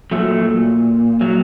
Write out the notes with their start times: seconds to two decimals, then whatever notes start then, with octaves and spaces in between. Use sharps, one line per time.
0.11 A#2 F#3 A3
1.21 F#3